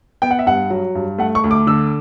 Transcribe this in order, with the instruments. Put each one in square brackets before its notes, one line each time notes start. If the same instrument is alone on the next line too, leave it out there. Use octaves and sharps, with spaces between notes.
[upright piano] B3 G5
F#5
E5
G2 F#5
F#3
G2
A3 F#5
C#6
D2
D6
D3 E6